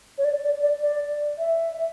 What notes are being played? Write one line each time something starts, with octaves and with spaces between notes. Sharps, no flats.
C#5
D5
D5
D5
D5
E5